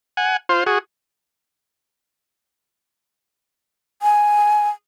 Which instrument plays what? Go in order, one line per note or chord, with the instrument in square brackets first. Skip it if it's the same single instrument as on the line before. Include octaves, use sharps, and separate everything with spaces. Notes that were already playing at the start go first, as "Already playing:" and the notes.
[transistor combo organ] F#5 G#5
F4 C5
F#4 G#4
[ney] G#5